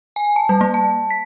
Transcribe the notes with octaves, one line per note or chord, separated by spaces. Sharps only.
G#5
A5
G3
A#3
A5
B6